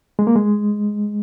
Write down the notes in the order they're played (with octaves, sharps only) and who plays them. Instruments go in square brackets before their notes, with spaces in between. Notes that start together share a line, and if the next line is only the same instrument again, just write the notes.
[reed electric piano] G#3
A#3
G#3